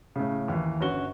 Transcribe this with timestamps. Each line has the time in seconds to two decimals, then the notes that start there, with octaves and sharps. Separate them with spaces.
0.16 A2 C#3
0.48 D#2 E3
0.81 G1 C#4 F#4 G7